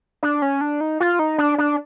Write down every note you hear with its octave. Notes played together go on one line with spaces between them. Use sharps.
D4
C#4
D4
D#4
F4
D#4
D4
D4